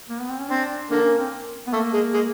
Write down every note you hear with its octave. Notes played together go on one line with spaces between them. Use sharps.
A#3
B3
C4
C#4
C4 D4
D3 A#3 D4
C#4
C4
B3
A3 A#3
G#3
G#3